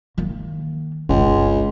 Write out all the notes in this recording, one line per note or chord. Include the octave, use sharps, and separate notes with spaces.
D#3 A#3
G1 C#2 C3